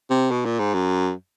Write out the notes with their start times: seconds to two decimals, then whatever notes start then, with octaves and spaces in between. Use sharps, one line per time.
0.10 C3
0.31 B2
0.45 A#2
0.59 G#2
0.74 F#2